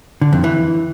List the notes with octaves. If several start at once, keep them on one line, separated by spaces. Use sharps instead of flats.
D3
F2
E3